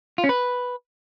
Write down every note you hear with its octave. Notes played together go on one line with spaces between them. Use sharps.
F4
C#4
B4